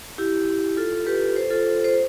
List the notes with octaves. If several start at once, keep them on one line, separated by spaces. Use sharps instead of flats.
E4 G4
F4 A4
G4 B4
A4 C5
F4 A4
C5